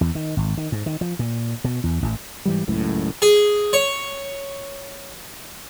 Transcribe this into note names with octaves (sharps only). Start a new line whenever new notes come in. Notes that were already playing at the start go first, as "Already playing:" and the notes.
E2
D#3
G#1
D#3
G#2
D#3
F3
A#2
B2
E2
A1
G#2 E3 G3
F#1 C#2 F#2 A2
G#4
C#5